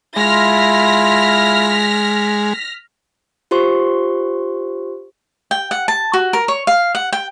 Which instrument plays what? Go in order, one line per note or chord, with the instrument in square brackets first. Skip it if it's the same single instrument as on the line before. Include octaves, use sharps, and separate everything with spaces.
[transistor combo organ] G#3 [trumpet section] E4 F4 [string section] F6 A#6 B6
[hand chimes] F4 G4 C5 C6 C#6
[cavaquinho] G5
F#5
A5
F#4
A#4
C#5
F5
F#5
G5